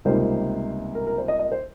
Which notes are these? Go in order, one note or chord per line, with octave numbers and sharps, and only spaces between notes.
C#2 C3 G3 A#3 D#4 C5
A#4
A#4
C5
D#5
D#5
C5